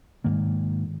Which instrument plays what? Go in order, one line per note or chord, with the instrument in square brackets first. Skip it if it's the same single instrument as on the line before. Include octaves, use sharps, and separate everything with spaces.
[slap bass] G#2 D#3 A#3